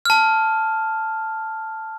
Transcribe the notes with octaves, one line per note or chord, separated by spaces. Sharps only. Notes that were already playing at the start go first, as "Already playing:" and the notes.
A5 F6